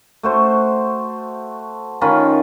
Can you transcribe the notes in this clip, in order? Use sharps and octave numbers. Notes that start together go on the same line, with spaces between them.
A3 F#4 C5
D#3 C#4 F4 B5